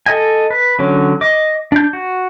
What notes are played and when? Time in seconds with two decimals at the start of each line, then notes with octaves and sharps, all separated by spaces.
0.06 A4 D#5 G#5
0.50 B4
0.79 D3 F#3 C#4
1.21 D#5 D6
1.72 D4 G6
1.93 F#4